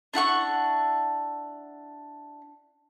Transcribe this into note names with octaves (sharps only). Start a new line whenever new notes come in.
D4 E4 F#5 C#6